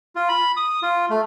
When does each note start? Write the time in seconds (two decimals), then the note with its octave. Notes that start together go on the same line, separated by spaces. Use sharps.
0.15 F4
0.29 B5
0.57 D#6
0.82 F4
1.10 A3